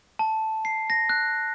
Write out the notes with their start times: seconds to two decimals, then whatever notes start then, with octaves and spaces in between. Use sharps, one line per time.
0.19 A5
0.65 C7
0.90 A#6
1.09 F#6